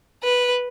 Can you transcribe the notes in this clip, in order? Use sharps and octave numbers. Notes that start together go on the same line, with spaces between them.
B4